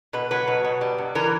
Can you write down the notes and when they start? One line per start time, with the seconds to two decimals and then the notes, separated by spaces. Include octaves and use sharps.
0.13 B2 B4
0.31 F#3 B4
0.48 B2
0.65 B2
0.81 G3
0.98 G2
1.15 E3 A#4